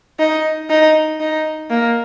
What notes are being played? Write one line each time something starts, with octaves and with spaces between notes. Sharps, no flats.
D#4
D#4
D#4
A#3